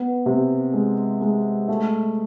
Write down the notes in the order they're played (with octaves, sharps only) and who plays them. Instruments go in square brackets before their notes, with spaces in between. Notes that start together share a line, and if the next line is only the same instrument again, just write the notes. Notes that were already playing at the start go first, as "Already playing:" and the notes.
Already playing: [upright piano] B3
C3
G#3
G#3
A3